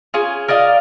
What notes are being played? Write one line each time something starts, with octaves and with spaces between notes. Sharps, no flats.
C#4 F4 G#4
A#4 D5 D#5 F5